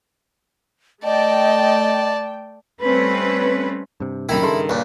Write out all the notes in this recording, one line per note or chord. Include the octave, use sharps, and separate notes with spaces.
A3 D5 D#5 G5 A5
G3 A3 C4 C#4 B4
G2 C3
C2 F#2 A#2 D3 D#3 E4 G5
G2 C#3 A4 C6
C#2 A#2